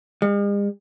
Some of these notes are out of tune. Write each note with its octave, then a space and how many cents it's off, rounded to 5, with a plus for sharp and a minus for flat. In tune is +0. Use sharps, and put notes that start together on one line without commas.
G#3 -45